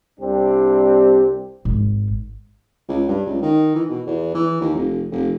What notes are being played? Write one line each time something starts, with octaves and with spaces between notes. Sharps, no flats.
C2 G3 C4 D4 G4
G#1
C#2
G2
C#2
D#3
E3
B2
E2
E3
D#2
F1
F1